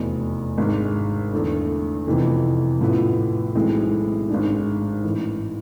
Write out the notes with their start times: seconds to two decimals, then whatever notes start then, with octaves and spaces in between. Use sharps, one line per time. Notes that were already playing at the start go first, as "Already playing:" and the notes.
Already playing: F1 E2 B2
0.57 G#1 G#2 G#3 D4
1.32 E2 D3 A3
2.07 F2 C3 E3 B3
2.81 A1 A2 F3 B3 E4
3.55 B1 A2 E3 G#3 C4
4.29 G#1 G#2 G#3 D4
5.04 A1 G#2 E3